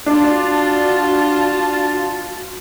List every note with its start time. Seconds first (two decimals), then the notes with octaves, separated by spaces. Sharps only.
0.06 D4 F4 F#4 A5